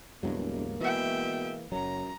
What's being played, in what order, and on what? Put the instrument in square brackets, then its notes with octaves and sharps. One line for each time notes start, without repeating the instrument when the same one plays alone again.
[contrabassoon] E1 [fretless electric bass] C#2 G2 F#3 [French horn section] G#3 A#3
[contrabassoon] B2 [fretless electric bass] E3 [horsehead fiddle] E5 G5
[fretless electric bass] F#1 F#3 [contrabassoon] F#2 [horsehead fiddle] A#5